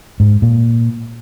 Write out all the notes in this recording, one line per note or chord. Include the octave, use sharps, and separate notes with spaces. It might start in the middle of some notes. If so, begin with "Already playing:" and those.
G#2
A#2